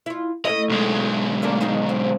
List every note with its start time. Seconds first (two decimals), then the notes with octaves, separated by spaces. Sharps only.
0.06 E4 F4
0.45 A3 C#4 E4 D#5
0.69 B1 G#3
1.42 A3 A#3 D4
1.61 D#3 D#4 G#4
1.89 C4